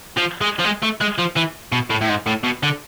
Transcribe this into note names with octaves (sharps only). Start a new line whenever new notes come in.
F3
G#3
F3
G#3
A3
G#3
F3
E3
B2
A2
A2
G#2
A2
B2
D3